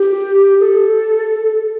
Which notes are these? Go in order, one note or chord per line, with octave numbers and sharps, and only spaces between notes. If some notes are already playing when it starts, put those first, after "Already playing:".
Already playing: G4
A4